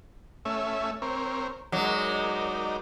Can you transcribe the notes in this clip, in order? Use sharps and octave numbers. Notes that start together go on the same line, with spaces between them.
A3 C#4 E5
C4 A#4 C#5
F#3 G#3 D#4 A#4 D5